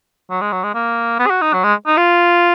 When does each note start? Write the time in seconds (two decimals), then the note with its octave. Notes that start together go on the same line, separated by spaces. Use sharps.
0.30 F#3
0.41 G#3
0.52 F#3
0.64 G#3
0.75 A#3
1.19 B3
1.26 G#4
1.30 F#4
1.42 D#4
1.53 F#3
1.64 G#3
1.87 D#4
1.97 F4